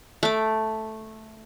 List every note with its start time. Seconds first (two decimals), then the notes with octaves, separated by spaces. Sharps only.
0.23 A3 D6